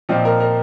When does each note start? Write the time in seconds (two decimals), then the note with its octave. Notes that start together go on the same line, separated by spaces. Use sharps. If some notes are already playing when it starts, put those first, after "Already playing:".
0.09 A#2 F3 C4 D#4 D5
0.25 A#4
0.40 A#4